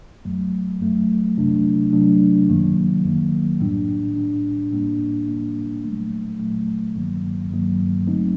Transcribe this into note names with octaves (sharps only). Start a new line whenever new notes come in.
F#2 F#3 A3
F#2 F#3 A3
C3 F#3 A3 D4
C3 F#3 A3 D4
F#2 D#3 F#3 A#3
F#2 D#3 F#3 A#3
A2 G3 D4
A2 G3 D4
A2 G3 A#3 D4
A2 G3 A#3 D4
A#2 F#3 A3
A#2 F#3 A3
G2 D#3 F#3 A#3
G2 D#3 F#3 A#3
D3 F#3 A3 C4 D#4